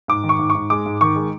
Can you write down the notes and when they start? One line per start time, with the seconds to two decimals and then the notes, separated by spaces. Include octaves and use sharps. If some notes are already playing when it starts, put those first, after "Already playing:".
0.08 G#2 D6
0.24 D#3
0.29 C#6
0.39 G#2
0.50 C#6
0.55 G#2
0.70 G#3 D6
0.86 G#2
1.01 D#3 C#6
1.16 G#3